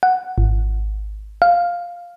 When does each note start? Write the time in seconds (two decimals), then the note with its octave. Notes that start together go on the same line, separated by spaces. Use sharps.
0.03 F#5
0.38 G#1
1.42 F5